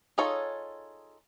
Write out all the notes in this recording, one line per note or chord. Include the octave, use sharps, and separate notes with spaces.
D#4 F4 G#4 A4 C#5